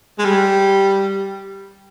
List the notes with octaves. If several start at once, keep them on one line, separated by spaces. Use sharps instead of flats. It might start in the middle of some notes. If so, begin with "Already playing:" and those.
G#3
G3